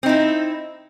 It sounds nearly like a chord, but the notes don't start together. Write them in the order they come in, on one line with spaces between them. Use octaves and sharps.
C4 D#4 E4